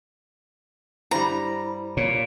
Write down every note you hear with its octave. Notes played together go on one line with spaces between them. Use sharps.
G2 G3 E4 C5 A#5
A#2 C#5